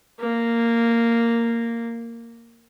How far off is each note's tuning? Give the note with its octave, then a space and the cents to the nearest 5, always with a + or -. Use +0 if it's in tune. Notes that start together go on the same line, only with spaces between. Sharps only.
A#3 -10